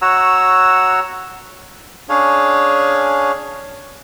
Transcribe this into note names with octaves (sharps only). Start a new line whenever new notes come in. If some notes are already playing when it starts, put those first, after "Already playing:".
F#4 C#5 F#5 A#5 E6
C#4 D4 G#4 C#5 F5